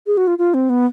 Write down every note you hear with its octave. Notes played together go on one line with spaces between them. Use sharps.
G#4
F#4
F4
F4
C4
B3